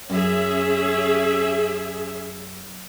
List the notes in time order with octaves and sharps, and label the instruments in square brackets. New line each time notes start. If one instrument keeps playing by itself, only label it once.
[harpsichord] F#2 [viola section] C#4 G#4 E5